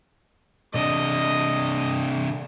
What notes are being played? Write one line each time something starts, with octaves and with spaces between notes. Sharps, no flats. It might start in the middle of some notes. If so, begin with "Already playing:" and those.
C3 D4 D#5